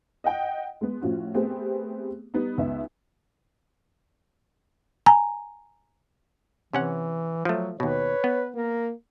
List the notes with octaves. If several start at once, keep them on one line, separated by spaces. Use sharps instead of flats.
D#5 F#5 G5
G#3 B3
A2 F3 C#4 F4 F#4
A3 B3 C4 G4 G#4
G3 B3 D#4
C#2 B3 D#4 E5
G#5 A#5
C3 E3 C#4 F#5
F3 F#3 A3
D#2 B2 B4 C#5
B3
A#3 A#4